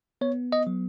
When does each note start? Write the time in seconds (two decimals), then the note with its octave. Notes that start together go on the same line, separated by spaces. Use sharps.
0.21 B3 C#5
0.52 D#5
0.67 F#3